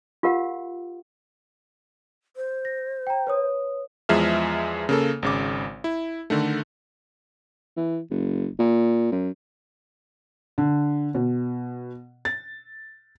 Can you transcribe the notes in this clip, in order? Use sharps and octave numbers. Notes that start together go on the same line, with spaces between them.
F4 G4 A#4 F5 F#5
C5
A#6
G5 A#5
B4 C#5 D#6
E2 F3 G#3 E5 F6
C#3 A#3 A4
G#1 C#3 D6
E4
D3 D#3 A3
E3
F#1
A#2
F#2
D3
B2
A6